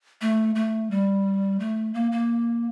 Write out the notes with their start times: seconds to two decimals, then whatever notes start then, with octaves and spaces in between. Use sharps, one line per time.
0.21 A3
0.55 A3
0.91 G3
1.60 A3
1.94 A#3
2.12 A#3